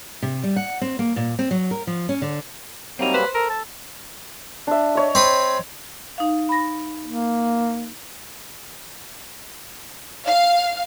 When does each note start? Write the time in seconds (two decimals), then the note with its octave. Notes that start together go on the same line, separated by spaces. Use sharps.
0.22 C3
0.43 G3
0.56 F#5
0.81 C4
0.99 A#3
1.16 A#2
1.39 C4
1.51 F#3
1.71 A#4
1.87 F3
2.09 C#4
2.22 D3
2.99 F#3 G3 A#3 C4 D#4
3.14 B4 C5
3.34 A4 A#4
3.50 A5
4.67 D4 E5
4.95 C#5 D#5
5.15 C4 B5 D#6
6.18 D#4 F5
6.49 B5 A#6
7.05 A#3
10.27 F5